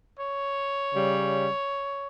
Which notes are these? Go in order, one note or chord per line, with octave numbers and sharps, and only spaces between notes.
C#5
C#3 G3